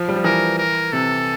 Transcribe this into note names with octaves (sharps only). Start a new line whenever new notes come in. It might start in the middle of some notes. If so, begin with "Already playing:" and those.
Already playing: F3
G3
F3
E3 A#4
A#4
C3 A4